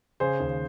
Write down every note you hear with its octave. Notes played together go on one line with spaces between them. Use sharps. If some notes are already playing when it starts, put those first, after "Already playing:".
C#3 G#4 C5
D#2